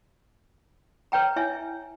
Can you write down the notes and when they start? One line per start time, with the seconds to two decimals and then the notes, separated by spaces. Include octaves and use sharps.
1.12 B4 C#5 G5 A#5
1.36 E4 C#5 E5 G#5